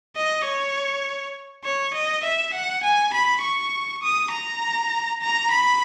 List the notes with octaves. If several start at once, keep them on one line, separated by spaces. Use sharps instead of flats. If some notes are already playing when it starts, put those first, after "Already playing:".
D#5
C#5
C#5
D#5
E5
F#5
G#5
B5
C#6
D#6
A#5
A#5
B5